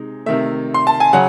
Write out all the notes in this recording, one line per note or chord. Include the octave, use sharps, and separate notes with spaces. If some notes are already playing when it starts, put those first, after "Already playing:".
Already playing: C3 G#3 D#4
C3 D#3 A3 E5
C6
A5
G#5
C#3 F#3 F#5